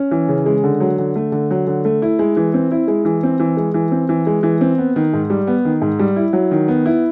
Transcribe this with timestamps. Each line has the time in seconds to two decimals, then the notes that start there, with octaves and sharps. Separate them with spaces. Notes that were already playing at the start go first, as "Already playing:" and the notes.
Already playing: C#4
0.11 E3
0.29 C#3
0.46 G#3
0.64 D3
0.80 F#3
0.99 D3
1.16 A3
1.32 D3
1.51 F#3
1.67 D3
1.85 A3
2.02 E4
2.19 G#3
2.37 E3
2.54 C4
2.71 E4
2.88 G#3
3.05 E3
3.23 C4
3.40 E3
3.57 G#3
3.74 E3
3.91 C4
4.09 E3
4.27 G#3
4.43 E3
4.61 C4
4.78 B3
4.96 D#3
5.13 G#2
5.30 G3
5.47 B3
5.65 D#3
5.81 G#2
5.99 G3
6.16 E4
6.33 F#3
6.51 D#3
6.68 B3
6.86 E4